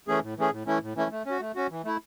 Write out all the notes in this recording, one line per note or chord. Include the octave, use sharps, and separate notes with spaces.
E3 A3 C#4 G#4
A2
E3 A3 C#4 G#4
A2
E3 A3 C#4 E4
A2
E3 A3 C#4 E4
A3
C#4 F#4
A3
C#4 F#4
E3
A3 E4